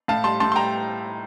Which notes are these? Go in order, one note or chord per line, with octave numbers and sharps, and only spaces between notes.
A2 F5 A5
G3 A5 C6
A2 A5 C6
C6
G3 G5 A#5